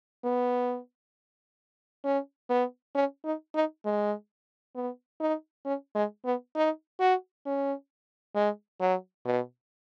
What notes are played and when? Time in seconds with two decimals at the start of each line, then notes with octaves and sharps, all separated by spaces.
0.24 B3
2.04 C#4
2.50 B3
2.95 C#4
3.25 D#4
3.55 D#4
3.85 G#3
4.75 B3
5.20 D#4
5.65 C#4
5.95 G#3
6.25 B3
6.55 D#4
7.00 F#4
7.46 C#4
8.35 G#3
8.81 F#3
9.25 B2